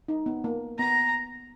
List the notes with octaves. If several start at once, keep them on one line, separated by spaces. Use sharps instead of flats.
D#4
B3
A#3
B3 A#5